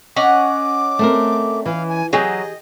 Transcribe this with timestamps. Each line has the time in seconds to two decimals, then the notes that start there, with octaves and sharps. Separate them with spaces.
0.16 C#4 D#5 F#5 D6
0.99 A3 C4 A#4
1.65 E3 F5
1.89 G#5
2.13 F#3 G4 G#4 D#5 G5